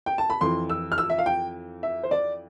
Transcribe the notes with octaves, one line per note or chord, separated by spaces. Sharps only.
G5
A5
B5
F2 E3 C6
E6
F6
E6
E5
F5
G5
E5
C5
D5